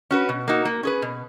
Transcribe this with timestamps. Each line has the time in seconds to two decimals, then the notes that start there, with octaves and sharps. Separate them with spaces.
0.11 C#4 F#4 B4
0.29 B2
0.48 A#3 D#4 F#4
0.65 A#3
0.83 C#4 G#4 B4
1.02 B2